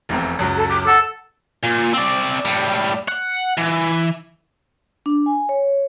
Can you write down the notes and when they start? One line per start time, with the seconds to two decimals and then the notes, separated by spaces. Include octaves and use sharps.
0.09 F1 E2 C4
0.39 C#2 F#2 F#3
0.57 A4
0.70 D6
0.87 A4 F#5
1.63 A#2
1.93 C4 D5
2.45 A2 G3
3.08 F#5
3.58 E3
5.06 D4
5.26 G#5
5.49 C#5